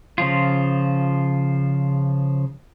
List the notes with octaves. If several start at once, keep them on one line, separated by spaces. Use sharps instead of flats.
C#3 F3 F4